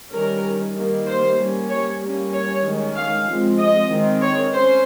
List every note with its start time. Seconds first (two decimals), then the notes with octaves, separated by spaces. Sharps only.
0.12 D#3 G3 C#4 A#4
0.75 D#3 G3 A#3
1.06 C5
1.38 G3 A#3 C#4
1.69 C#5
2.01 G3 A#3 C#4
2.33 C#5
2.64 D#3 G#3 C#4
2.95 F5
3.27 F3 G#3 C4
3.59 D#5
3.90 D#3 G#3 C4
4.22 C#5
4.53 C#4 C5